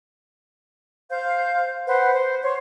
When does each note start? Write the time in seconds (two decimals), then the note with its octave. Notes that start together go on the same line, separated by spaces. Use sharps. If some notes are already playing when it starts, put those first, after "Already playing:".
1.10 C5 F5 G6
1.86 B4 C5 F#5
2.14 C5
2.42 C5 C#5